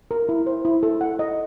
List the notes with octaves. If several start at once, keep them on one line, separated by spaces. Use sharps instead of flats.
A#4
E4
C5
E4
A4
F#5
D#5